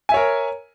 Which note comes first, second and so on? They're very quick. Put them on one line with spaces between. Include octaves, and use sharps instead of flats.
G#5 E5 C#5 A#4